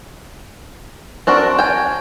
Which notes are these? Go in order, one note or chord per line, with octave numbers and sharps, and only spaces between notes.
C4 D4 F#4 A#4
G5 G#5